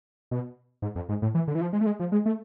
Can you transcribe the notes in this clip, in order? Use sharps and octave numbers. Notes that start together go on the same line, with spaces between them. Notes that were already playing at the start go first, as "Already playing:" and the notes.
B2
G#2
F2
G#2
A2
E3
D3
E3
F3
G#3
A3
G#3
F3
G#3
A3